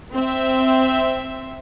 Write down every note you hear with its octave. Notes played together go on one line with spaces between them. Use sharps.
C4 E5